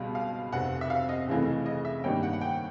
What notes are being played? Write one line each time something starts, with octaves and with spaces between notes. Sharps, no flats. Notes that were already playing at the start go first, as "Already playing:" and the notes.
Already playing: C#2 B2 G3
F5
F1 F2 C3 F#5
E5
F5
D#5
F1 F2 C#3 E3 A3
D#5
E5
G2 D#3 G3 A#3 C#4 G5
F#5
F#5
G5